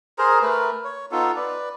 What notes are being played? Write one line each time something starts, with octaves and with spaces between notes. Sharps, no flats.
G#4 A#4 C5 A#5
A3 A#4 B4
C#5
B3 D#4 F4 A4
B4 D5